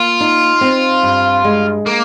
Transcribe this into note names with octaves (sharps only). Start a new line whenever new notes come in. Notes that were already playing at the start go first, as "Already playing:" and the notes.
Already playing: A#3 F4
D#4
C4
G2
G#3
A#3